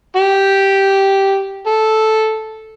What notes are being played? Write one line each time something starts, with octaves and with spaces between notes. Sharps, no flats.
G4
A4